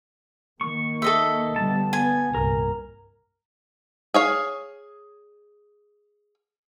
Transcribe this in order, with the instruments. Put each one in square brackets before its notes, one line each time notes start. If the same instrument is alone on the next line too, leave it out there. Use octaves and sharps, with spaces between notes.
[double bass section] D#3 A#3 [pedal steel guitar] C#6
[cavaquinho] A4 D#5 E5
[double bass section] D3 G3 B3 [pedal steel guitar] A5
[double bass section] B3 [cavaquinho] G#5
[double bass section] C2 G2 A#2 [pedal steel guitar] A#4
[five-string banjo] G#4 C#5 F5